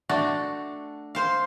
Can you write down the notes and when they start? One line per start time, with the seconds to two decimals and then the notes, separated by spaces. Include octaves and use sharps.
0.09 A3 D4 F#4
1.15 C5 F5